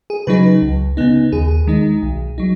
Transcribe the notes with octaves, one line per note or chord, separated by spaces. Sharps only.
G#4
C#3 F#3 D#4 B4
C#2
C#3 B3 D#4
D#2 G#4
D#3 G#3 D#4
B1
F#3 D#4